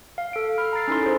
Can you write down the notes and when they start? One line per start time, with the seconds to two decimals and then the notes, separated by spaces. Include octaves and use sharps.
0.18 F5
0.33 A4 D7
0.58 B5 F6
0.73 A#5 E6 A6 C7
0.88 C#4 D#4 E4 A4 C6
1.03 G#4 C5